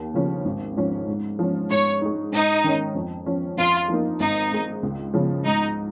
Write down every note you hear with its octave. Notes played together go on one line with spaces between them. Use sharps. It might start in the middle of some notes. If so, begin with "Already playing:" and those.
Already playing: D#2
C#3 F3 C#4
G#1
G#2 F3 C#4
G#2
F3 C#4
G#2 C#5
G#3 D#4
G#2 D#4
D#3 C#4
F2
F3 C#4
F2 F4
F3 A#3 D#4
G#1 D#4
G#2 G#3
C#2
C#3 F3 C#4
G#2 D#4